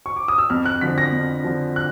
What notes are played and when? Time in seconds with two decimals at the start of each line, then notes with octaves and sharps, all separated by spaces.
0.06 C#6
0.16 D6
0.28 D#6
0.38 E6
0.50 F2 F6
0.66 F#6
0.81 D3 F3 B6
0.98 A#6
1.12 F2
1.44 D3 F3
1.76 F#6